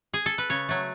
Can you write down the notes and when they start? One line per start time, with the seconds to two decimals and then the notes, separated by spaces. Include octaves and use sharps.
0.14 G#4
0.26 A4
0.38 B4
0.50 C#3 C#5
0.69 F#3 A3